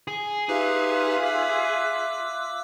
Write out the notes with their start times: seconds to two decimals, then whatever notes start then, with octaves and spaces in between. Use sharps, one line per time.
0.08 G#4
0.48 D#4 F4 G4 B4 E5 F#6
1.23 D6 E6